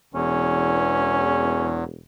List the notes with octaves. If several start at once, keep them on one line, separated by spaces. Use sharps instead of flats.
E1 E2 C#4